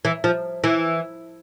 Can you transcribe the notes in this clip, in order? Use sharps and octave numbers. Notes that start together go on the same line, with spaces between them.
E3
F3
E3